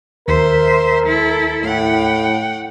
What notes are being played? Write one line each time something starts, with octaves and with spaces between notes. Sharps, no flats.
D#2 A#4 C5 E5
E4 A4
A2 F#5 G5